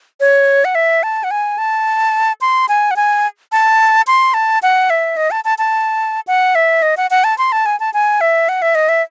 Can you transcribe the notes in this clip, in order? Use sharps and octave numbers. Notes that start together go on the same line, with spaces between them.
C#5
F#5
E5
A5
F#5
G#5
A5
C6
G#5
F#5
G#5
A5
C6
A5
F#5
E5
D#5
A5
A5
A5
F#5
E5
D#5
F#5
F#5
A5
C6
A5
G#5
A5
G#5
E5
F#5
E5
D#5
E5